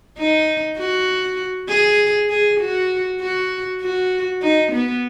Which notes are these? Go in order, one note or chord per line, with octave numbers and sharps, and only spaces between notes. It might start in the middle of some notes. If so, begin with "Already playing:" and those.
D#4
F#4
G#4
G#4
F#4
F#4
F#4
D#4
B3